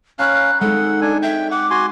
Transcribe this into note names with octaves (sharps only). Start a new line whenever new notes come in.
C#4 F5 A#5 B5 F#6
G#3 C4 D#4 A4 F#5
D4 G#5
E5 G5
F#5 D6
F#4 G#5 C6